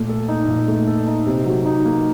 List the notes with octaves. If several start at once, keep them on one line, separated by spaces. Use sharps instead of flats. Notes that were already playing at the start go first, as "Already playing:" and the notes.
Already playing: A#2 A3
A4
D#4
A#2
A3
A4
D#4
C3
F#3
D#4
A#3